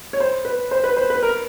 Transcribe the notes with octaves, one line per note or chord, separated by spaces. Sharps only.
C#5
C5
B4
C5
B4
C5
B4
A#4